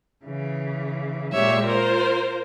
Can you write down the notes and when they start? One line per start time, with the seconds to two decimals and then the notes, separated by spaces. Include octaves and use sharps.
0.24 C#3 E3
1.32 A#2 G#3 G4 C#5 E5
1.64 F4 A#4 C5